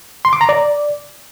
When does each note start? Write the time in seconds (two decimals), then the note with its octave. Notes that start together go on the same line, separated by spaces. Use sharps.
0.25 C6
0.33 D6
0.41 A#5
0.49 D5